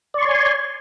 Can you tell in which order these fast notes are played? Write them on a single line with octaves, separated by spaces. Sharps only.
D5 C#6 C6 C#5 G#5